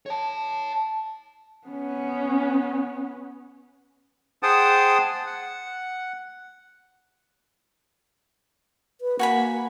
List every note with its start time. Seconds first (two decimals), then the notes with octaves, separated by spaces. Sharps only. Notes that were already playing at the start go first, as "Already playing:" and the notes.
0.06 C#5 A5
1.67 B3 C#4
4.43 G#4 C5 F#5 G5 A5 D#6
5.27 F#5
9.01 B4
9.19 A#3 F#4 G#5 B5